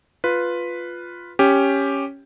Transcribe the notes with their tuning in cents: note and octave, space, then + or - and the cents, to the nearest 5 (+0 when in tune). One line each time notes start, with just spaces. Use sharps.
F4 +5 B4 +0
C#4 +0 G4 +5